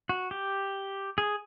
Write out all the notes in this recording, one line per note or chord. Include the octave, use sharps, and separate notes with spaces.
F#4
G4
G#4